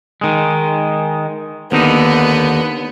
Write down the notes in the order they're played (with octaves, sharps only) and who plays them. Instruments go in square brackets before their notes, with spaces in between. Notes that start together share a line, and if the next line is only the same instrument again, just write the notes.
[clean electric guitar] D#3 G#3
[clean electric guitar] D#2 D3 D#4 [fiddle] B3